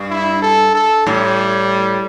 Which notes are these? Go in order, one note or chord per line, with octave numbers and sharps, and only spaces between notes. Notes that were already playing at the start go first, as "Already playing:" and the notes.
Already playing: G2
E4
A4
A4
A2 G3